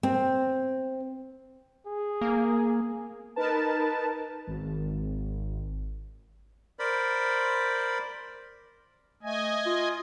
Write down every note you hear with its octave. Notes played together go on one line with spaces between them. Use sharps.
C4
G#4
A#3
D#4 A#4 B4 A5
G#1
A#4 C5 D5 B5
A3 D#5 G#5
F4